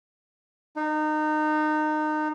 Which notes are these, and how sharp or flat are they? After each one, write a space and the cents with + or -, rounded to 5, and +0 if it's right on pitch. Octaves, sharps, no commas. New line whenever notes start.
D#4 -25